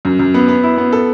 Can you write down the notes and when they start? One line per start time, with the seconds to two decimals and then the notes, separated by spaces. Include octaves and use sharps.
0.05 F#2
0.19 F#2
0.34 B3
0.48 B3
0.63 E4
0.78 B3
0.92 A4